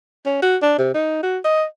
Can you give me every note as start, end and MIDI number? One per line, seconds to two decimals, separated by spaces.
0.26 0.40 61
0.42 0.56 66
0.62 0.77 62
0.78 0.91 48
0.94 1.22 63
1.23 1.38 66
1.44 1.64 75